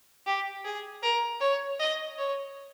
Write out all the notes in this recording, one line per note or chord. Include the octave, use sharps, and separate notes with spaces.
G4
G#4
A#4
C#5
D#5
C#5